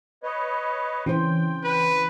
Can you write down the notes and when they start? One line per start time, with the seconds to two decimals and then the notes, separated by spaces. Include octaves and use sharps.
0.23 B4 C#5 D#5
1.06 E3 C#4 C5 G5
1.64 B4